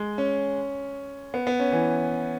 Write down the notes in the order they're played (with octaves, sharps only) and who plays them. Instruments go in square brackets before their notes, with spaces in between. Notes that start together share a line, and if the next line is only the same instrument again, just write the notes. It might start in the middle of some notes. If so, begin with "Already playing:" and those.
Already playing: [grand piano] G#3
C#4
B3
B3
C#4
E3